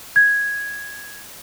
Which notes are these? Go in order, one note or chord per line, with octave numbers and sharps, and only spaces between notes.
G#6